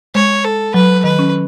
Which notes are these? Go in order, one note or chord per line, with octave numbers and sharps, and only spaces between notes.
G#3 C#5
A4
F#3 B4
D#3 B4
C#4